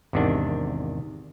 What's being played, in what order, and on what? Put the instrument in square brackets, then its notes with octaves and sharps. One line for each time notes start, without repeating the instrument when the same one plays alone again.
[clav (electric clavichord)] G#1 E2 C3 D#3 D4